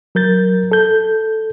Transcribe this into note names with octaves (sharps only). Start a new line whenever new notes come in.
F#3 A#4 G6 A6
A4 G6